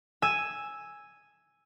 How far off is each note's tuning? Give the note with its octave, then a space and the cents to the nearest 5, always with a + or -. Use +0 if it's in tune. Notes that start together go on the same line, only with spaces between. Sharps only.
G#5 +0 E6 +0